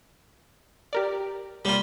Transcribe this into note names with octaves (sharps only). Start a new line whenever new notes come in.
G4 A#4 D5
C3 G3 A#3 F4